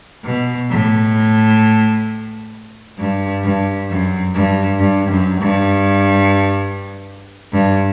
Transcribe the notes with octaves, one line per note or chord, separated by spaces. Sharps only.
B2
A2
G2
G2
F#2
G2
G2
F#2
G2
G2